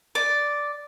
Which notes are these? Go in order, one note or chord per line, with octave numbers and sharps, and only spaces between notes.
D5 D6